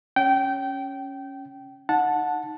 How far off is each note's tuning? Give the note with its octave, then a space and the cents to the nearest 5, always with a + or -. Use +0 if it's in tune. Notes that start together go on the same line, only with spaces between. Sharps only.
C#4 +0 G5 -20
D#4 +0 F#5 -15 A5 +0